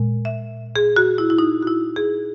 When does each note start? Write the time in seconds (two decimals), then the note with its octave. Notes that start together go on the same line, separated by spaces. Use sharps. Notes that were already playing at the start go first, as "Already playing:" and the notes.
Already playing: A#2 G#3
0.25 E5
0.76 G#4
0.96 F#4
1.18 E4
1.30 E4
1.39 D#4
1.63 F#4
1.67 E4
1.96 G#4